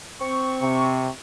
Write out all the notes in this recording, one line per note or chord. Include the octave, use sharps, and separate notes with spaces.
C4 C#6
C3